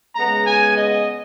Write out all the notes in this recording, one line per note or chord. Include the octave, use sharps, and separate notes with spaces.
C#3 G#3 B3 A#5
G#5
D#5